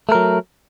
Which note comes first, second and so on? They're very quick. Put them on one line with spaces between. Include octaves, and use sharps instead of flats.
A3 A#4 F#3